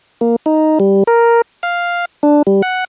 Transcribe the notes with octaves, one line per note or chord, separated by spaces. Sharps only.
A#3
D#4
G3
A#4
F5
D4
G3
F#5